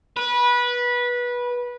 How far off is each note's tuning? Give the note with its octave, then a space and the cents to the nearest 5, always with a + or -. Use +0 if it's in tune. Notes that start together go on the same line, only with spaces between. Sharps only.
B4 -20